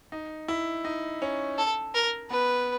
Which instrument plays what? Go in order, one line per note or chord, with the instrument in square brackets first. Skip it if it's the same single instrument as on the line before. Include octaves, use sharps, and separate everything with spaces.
[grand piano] D#4
E4
D#4
C#4
[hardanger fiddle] A4
A#4
[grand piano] B3 [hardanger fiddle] B4